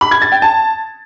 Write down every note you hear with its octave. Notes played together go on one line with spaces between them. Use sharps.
B5
G#6
A6
G5
A5